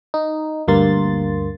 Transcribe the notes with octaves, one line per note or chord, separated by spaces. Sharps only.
D#4
D2 G2 A#3 C6 A6